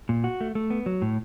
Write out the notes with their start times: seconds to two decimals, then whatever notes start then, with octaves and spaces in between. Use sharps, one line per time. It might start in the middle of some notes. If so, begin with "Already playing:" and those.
0.09 A#2
0.24 F#4
0.41 A3
0.55 A3
0.70 B3
0.86 F#3
1.02 A2